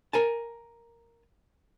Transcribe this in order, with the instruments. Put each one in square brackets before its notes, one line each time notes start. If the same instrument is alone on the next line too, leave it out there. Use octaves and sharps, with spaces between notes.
[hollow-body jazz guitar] A#4 G#5 A5